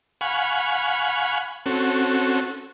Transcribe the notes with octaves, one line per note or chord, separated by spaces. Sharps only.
F5 F#5 G#5 B5 C#6
C4 C#4 F#4 A4